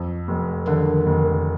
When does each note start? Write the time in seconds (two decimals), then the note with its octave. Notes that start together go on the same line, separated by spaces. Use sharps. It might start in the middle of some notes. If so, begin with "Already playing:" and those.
Already playing: F2
0.28 F1
0.67 D3 D#3
1.06 F1